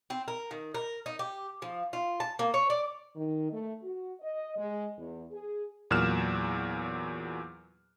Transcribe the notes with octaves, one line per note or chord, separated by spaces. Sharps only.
C4
A#4
D#3
A#4
D#4
G4
F3
F4
A5
A#3
C#5
D5
D#3
A3
F#4
D#5
G#3
E2
G#4
E2 A#2 F#3 F6 F#6 E7